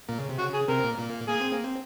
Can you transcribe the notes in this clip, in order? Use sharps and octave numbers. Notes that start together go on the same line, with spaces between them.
A#2 A#3
C#3
C3
C#3 F#4
G#4
C3 C4 A#4
A#2 A#3
A#2 A#3
A#3 G#4
C4
A#3
C4